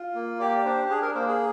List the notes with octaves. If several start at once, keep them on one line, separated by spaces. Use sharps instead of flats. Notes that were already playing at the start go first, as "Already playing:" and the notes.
Already playing: F4
A#3
G4 D5
D5
D4 C5
D4 G#4
A#4
A#3 C5
G#4